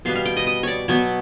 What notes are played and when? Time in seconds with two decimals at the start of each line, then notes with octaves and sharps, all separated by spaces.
0.05 B2 G3 B3 F5
0.15 F5
0.25 G5
0.37 D#5
0.47 D#5
0.63 C#5 D5
0.88 B2 F#3 B3 C#5